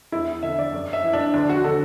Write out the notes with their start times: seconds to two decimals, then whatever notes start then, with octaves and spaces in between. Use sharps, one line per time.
0.12 E2 E4
0.43 D3 E5
0.59 D5
0.73 F#2
0.93 E5
1.03 E3
1.13 D4
1.34 D2 D4
1.49 F#4
1.64 D3 A4